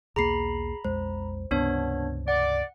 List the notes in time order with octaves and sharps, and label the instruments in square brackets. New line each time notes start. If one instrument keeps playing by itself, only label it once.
[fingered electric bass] B1 E2 A#3 [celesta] G#4 C7 [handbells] A#5 B5
[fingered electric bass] B1 F2 G#3 [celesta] C5
[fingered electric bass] C#2 G2 C3 [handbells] B3 D4 C#5
[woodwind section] D5 [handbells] F#5